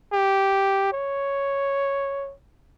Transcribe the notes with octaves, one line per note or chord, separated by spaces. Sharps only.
G4
C#5